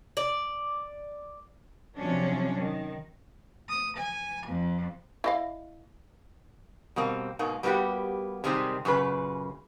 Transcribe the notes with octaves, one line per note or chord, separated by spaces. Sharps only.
D5
C3 F3 F#3 C#4 D4
D#3
D#6
G#5
F2
E4 D#5 F5
B2 G3 A#3 C4
G#2 B2 A#3
G3 A#3 B3 E4 F#4 G4
C3 D#3 G3 G#3 C4
F#2 A#2 C#3 B4